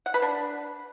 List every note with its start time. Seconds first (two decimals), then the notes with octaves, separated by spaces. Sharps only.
0.06 F#5
0.14 B4
0.22 D4